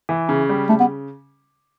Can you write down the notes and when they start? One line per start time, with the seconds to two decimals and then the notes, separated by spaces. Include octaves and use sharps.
0.09 E3
0.29 C#3
0.49 G3
0.69 C#3 A3
0.80 B3